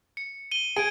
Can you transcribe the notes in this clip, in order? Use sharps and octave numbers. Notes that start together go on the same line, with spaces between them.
C#7
D#7 G7
G#4 G#6 D7 D#7